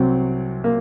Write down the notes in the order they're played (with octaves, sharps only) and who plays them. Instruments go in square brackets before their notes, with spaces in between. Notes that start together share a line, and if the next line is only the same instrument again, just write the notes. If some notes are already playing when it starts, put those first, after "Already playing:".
Already playing: [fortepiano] C2 C3 F#3 C4
A#3